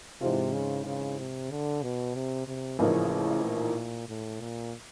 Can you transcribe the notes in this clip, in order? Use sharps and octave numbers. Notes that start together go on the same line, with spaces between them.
G#2 C3 E3 G#3 C4 F4
C#3
C#3
C3
D3
B2
C3
C3
A1 A2 C#3 F3 A#3 D#4
A#2
A2
A#2